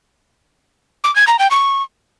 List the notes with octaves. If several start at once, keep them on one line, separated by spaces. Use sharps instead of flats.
D6
G#6
A#5
G5
C#6